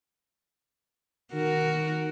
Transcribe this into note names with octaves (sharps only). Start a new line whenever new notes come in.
D#3 F#4 A#4